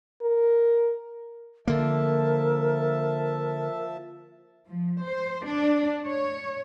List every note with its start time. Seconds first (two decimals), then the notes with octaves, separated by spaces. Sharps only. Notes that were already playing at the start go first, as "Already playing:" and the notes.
0.22 A#4
1.68 D3 F3 A#3 A#4 E5 A5
4.67 F3
5.03 C5
5.45 D4
6.07 C#5